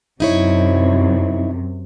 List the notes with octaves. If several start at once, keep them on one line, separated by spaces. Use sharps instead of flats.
F#2 C3 D#4 E4 C#5